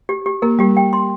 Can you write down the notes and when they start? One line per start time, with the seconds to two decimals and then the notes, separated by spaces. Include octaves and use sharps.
0.09 G4
0.26 G4
0.42 A#3 A#4
0.59 G3 G4
0.77 G5
0.93 C6